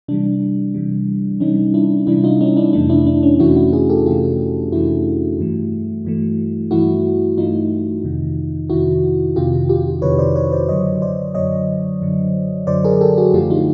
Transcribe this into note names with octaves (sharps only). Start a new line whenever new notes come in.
C3 E3 G3 D4
C3 E3 G3
C3 E3 G3 C#4 D#4
D4 E4
C3 E3 G3 D4 E4
D#4 F4
C#4 D#4
D4 E4
F2 C3 E3 A3 D4
D4 E4
D4
C#4
F2 C3 E3 A3 E4 F#4
E4 F#4
F#4 G#4
G4 A4
F2 C3 E3 A3 F4 G4
F2 C3 E3 A3 E4 F#4
G2 E3 A3
G2 E3 A3
G2 E3 A3 E4 F#4
G2 E3 A3 D#4 F4
F2 C3 D#3
F2 C3 D#3 E4 F#4
F2 C3 D#3 F4 G4
F4 G4
F2 C3 D#3 B4 C#5
C5 D5
B4 C#5
C5 D5
F#2 D3 F#3 C#5 D#5
C5 D5
F#2 D3 F#3 C#5 D#5
F#2 D3 F#3
F#2 D3 F#3 C5 D5
G#4 A#4
G4 A4
F#4 G#4
F#2 D3 F3 A3 F4 G4
D#4 F4